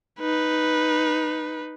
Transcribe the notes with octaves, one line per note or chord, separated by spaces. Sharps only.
D#4 B4